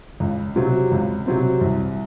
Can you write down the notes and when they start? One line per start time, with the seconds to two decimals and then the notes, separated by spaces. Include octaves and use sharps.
0.20 C#2
0.56 C3 F#3 C4
0.91 C#2
1.26 C3 F#3 C4
1.61 C2